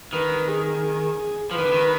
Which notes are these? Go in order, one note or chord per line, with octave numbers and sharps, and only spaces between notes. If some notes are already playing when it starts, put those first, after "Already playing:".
D#3 B4
G#4
F3 B4
D#3
D3
D#3